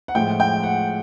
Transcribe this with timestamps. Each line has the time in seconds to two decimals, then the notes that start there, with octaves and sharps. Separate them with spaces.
0.08 F#5
0.15 A2 F3 G#3 G5
0.40 G5
0.63 F#5